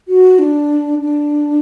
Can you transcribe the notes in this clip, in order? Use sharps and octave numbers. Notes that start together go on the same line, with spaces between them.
F#4
D4
D4